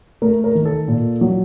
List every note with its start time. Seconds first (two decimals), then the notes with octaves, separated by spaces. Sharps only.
0.22 A3 A#4
0.44 A#4
0.55 D#3
0.65 A4
0.88 A#2
1.21 F#3